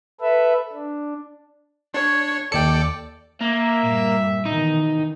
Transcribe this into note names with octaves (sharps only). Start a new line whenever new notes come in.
A4 B4 E5
D4
D4 C#5
D#2 A4 D5 G5 C#7
A#3 E5
G2 A#2 G3
B2 D#3 E3 D#4